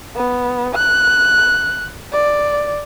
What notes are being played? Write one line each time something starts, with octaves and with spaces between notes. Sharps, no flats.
B3
F#6
D5